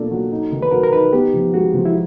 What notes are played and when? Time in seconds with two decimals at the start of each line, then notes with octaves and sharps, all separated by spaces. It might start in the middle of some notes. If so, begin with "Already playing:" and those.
Already playing: B2 A#3 D4 F4 A4
0.11 F#3
0.32 D#4
0.52 D#3
0.63 B4
0.71 F#3 A#4
0.83 A#4
0.93 D#4 B4
1.13 B3 G4
1.34 F3
1.54 G#3 F#4
1.74 F3
1.85 E4